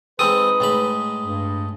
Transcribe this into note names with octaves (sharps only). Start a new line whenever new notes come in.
G#3 C4 D#4 G#4 A4 B4 D#6
A2 G#3 B5
G2